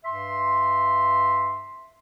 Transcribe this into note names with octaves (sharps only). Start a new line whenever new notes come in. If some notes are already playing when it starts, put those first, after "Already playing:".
G2 E5 C6